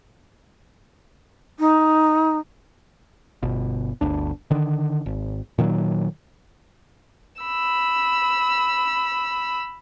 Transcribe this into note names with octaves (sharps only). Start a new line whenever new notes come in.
D#4
G1 B2
G1 D2 D4
D3 D#3
G#1
A#2 D#3 F3 F#3
B5 E6